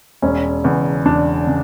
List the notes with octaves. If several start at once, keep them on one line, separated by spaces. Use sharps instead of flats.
E1 C#4
E2 C#3
E1 D4
C#3